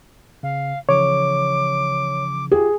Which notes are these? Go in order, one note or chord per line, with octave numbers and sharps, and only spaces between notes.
C#3 F5
C#3 E3 F3 C#5 D6
F4 G4 G#4